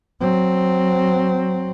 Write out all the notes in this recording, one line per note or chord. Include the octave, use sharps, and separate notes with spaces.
F#3 C4